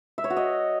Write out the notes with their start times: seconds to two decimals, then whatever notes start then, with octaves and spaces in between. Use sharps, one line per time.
0.18 E5
0.24 C#5
0.30 F#4
0.37 D#5